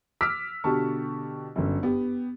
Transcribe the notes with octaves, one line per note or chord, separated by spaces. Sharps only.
D6 E6 F6 B6
B2 D3 G4 A5 C#6
G1 F#2
B3 G4